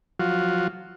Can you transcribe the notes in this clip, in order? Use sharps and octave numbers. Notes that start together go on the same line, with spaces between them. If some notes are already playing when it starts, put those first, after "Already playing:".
F3 F#3 F4 F#4